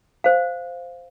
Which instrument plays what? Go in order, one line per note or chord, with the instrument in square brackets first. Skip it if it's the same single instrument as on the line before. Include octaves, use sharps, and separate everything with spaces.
[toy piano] C5 F5